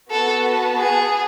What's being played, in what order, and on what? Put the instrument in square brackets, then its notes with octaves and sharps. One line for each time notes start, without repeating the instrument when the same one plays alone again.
[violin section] B3 F#4 B4 F#5 A5 [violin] A4
[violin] G#4